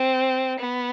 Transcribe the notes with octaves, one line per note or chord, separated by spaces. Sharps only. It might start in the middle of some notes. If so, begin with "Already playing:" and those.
Already playing: C4
B3